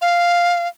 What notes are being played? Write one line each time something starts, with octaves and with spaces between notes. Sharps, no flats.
F5